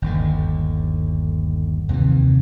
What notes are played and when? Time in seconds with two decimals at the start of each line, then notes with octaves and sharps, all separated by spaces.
0.02 G1 D#2 D3
1.89 D#2 C3 D#3 E3